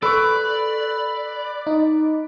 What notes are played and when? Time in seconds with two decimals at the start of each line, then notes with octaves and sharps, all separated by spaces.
0.03 A4 B4 D5 C#6
1.67 D#4